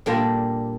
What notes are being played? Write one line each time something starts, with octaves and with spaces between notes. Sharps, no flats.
A#2 G3 A#3 D4